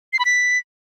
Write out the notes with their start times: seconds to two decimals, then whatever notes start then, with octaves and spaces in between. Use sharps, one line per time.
0.13 C7
0.19 B5
0.25 B6